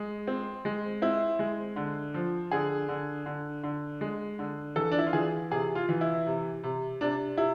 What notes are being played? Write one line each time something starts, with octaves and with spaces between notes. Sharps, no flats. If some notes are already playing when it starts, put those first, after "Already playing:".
Already playing: G#3
C4
G#3
C4 E4
G#3
D3
F3
D3 G#4
D3
D3
D3
G#3
D3
E3 A4
D4
E4
F4
E3 G#4
C3 G#4
F4
E3
E4
C3
C3
C3 D4
C3 E4